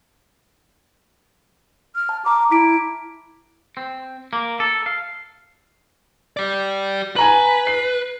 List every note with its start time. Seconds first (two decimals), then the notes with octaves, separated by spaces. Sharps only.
1.95 F6
2.09 A5
2.25 A5 A#5 D6 F6
2.51 E4 D6 B6 D7
3.77 C4
4.33 A#3
4.60 A4
4.86 F5
6.37 G4 D5
7.16 B4 G#5 A#5 F#7
7.67 C7